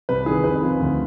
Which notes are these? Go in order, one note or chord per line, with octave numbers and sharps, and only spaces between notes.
C2 B4
D#3 G#4
F2 B4
F3
D2